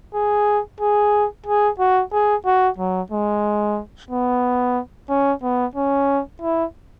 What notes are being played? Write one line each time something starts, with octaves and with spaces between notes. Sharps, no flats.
G#4
G#4
G#4
F#4
G#4
F#4
F#3
G#3
B3
C#4
B3
C#4
E4